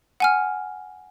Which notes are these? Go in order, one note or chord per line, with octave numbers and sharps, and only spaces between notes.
F#5 G#5 F6